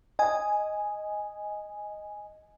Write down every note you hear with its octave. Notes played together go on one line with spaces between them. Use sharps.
D#5 G#5